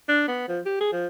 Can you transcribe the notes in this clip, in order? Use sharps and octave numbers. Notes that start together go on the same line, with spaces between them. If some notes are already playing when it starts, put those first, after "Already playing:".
D4
B3
F3
G4
G#4
F3